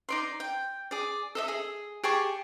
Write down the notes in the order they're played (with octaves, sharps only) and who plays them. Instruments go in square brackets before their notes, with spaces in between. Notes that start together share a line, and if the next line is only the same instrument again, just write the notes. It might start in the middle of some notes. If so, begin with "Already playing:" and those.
[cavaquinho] D#4 D5 C6
G5
G#4 D5
A4 D#5 E5
G#4
G4 G#4 A5 C#6